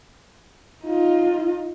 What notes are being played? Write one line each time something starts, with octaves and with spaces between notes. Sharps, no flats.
D#4 F4